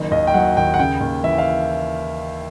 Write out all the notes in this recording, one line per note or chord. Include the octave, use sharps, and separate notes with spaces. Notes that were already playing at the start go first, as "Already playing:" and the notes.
Already playing: F#1 D#3
D#2 D#5
G5
F#3 F#5
D#2 G5
F#5
C#3 G5
D#2
E3 E5
F5